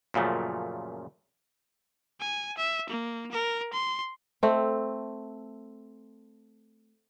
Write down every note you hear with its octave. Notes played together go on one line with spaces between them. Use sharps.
F#2 A#2 C#3 F3 A3
G#5
E5
A#3
A#4
C6
A3 C4